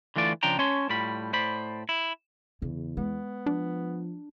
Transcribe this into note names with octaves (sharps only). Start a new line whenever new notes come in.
D3 E3 A3 F4 D5
C#3 F3 D4 G5 A#5
C#4 C#5 A5 C6
A2 G3 F4 B5
A2 C5 D5 B5
E4
E2 C#3
G#3 B3
F3 D4